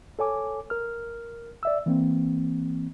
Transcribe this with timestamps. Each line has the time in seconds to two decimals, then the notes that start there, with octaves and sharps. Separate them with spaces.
0.19 A4 C#5 G#5 D6
0.70 A#4 F6
1.63 D5 E5 E6
1.86 E3 A#3 C4